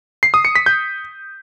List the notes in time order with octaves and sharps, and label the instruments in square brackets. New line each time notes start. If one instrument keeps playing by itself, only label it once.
[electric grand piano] C7
D#6
C#7
B6
G6